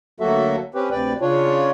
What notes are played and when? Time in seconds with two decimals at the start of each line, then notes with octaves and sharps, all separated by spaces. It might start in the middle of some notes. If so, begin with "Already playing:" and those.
0.20 D2 F#3 A#3 F#4 A4 E5
0.74 C4 C#4 G4 B4
0.91 D2 C3 B4 D5 G5
1.21 C#3 D4 F4 C#5